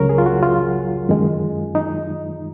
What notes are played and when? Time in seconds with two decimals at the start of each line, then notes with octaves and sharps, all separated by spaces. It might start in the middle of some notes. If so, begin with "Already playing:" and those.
Already playing: C#2 C#3 F#3 A#4 C#5
0.09 G#4
0.18 F4
0.26 F#4
0.43 F4
1.09 F#2 D#3 G#3
1.75 D#4